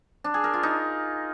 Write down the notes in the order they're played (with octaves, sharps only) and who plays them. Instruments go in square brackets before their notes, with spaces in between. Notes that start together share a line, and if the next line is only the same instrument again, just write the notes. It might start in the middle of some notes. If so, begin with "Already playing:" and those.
[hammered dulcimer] D4
G#4
A#4
F4
D#4